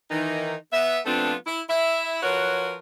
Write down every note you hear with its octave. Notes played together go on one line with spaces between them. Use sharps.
D#3 E3 D#4
B3 E5
F3 A3 B3 C4 D4 F4
E4
E4 E5
F3 F#4 A#4 B4 C#5